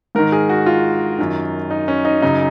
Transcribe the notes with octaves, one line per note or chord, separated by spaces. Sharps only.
G#2 D#3 A#4
G#4
F#4
F4
F#2 D#3
D#4
C#4
D#4
F#2 C#3 D#4